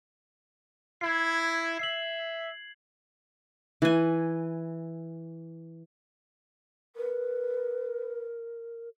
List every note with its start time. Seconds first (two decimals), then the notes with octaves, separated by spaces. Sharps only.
1.01 E4 G#6 C7
1.79 E5 C7 F#7
3.82 E3 G#5
6.96 A#4 B4